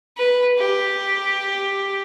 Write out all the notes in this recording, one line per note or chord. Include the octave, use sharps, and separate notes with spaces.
B4
G4